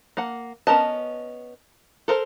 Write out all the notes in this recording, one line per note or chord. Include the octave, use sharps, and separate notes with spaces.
A#3 F#5
B3 C#4 A#4 D#5 A5
A4 A#4 C5